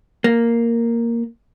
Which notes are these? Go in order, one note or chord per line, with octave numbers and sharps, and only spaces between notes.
A#3